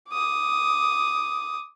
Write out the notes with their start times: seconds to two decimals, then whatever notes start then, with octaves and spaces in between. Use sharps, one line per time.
0.11 D6 D#6